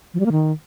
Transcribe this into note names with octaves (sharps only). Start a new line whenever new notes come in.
F3
G3
A#3
D#3